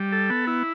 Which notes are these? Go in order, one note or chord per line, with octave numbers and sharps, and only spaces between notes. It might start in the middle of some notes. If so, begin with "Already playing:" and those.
Already playing: G3
A4
B3
E4